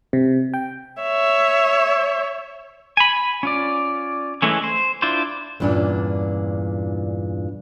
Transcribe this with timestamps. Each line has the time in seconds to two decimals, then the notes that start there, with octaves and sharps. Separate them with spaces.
0.13 C3
0.54 G5
1.02 C#5 E5
2.97 G#5 B5
3.43 C#4 F4 D5
4.42 E3 G#3 A3 C#4
4.64 C5
5.02 D4 E4 F4 C5
5.60 E2 G2 A#2 C#4 D4